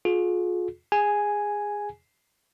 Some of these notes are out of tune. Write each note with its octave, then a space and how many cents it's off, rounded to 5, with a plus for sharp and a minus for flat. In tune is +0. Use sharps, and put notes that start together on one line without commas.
F4 +35 G#4 +35
G#4 -20 G#5 +0